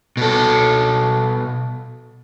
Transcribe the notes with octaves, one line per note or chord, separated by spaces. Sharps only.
B2 A4